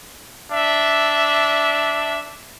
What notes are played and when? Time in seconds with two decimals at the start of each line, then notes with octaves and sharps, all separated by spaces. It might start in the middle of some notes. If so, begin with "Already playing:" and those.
0.51 D4 E5